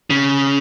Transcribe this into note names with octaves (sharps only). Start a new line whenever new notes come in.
C#3